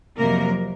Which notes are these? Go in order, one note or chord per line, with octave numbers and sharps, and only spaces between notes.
F2 C3 F#3 A#3 A#4